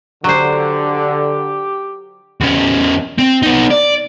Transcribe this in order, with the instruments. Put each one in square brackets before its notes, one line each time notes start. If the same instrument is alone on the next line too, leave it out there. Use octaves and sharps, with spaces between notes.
[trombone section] D3 [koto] F#3 C5 [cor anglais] G4
[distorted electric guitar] E2 C#4
C4
B3 D#4
D5